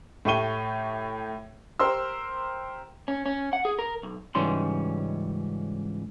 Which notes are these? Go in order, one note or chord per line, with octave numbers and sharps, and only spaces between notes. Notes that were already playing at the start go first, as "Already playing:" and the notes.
A2 A3 G4 C#6 D#7 G7
G4 A#4 C5 C6 E6
C#4
C#4
F#5
G#4
A#4
B1
C#2 G#2 E3 G3 C#4 C6